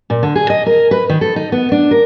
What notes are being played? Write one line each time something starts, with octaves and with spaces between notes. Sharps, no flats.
A#2
D3
G#4
D#5
A#4
B4
D#3
A4
D#4
B3
D4
A#4